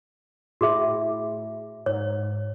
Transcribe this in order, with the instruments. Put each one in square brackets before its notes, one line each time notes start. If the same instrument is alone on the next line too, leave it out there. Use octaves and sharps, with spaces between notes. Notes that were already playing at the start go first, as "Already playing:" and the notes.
[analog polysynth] A2 [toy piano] F#4 G#4 E5
[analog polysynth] G#2 [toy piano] C#5